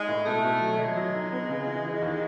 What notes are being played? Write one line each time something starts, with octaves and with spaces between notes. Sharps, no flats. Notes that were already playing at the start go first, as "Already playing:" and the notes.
Already playing: G#3 D#4
A2
B2 A3
B2
F#3
F#3 G#3
F#3
D#4
B3
C#3
E3
E3
D#2